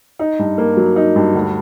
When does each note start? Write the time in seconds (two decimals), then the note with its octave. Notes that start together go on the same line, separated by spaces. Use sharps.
0.19 D#4
0.39 G2
0.58 A#3
0.77 F#3
0.96 D#4
1.16 G2
1.35 D2